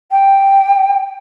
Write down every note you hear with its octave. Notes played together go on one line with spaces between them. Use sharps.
G5